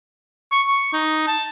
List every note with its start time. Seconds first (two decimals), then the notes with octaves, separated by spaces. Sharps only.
0.52 C#6
0.68 C#6
0.93 D#4
1.27 A5